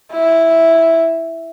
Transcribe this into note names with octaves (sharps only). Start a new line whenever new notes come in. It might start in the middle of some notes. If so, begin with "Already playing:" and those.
E4